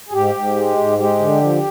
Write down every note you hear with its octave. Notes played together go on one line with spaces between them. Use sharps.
G#4
G#2 G4
G#2
G#3
G#2
G#3 G4
D3
F3